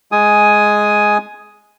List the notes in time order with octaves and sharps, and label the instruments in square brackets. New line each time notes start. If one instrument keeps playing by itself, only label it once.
[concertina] G#3 G#5 D#6